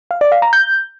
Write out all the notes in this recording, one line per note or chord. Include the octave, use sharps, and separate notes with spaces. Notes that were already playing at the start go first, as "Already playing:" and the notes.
F5
D5
F5
A#5
G6